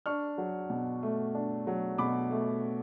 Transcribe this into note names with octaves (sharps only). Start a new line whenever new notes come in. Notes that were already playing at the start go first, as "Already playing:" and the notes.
D4 C#6 F6
F#3
B2
A3
D4
F#3
B2 B5 D6
A3